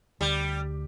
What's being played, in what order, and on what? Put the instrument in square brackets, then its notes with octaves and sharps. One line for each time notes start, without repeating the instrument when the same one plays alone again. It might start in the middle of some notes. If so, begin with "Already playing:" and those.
[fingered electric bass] D2 [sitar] G3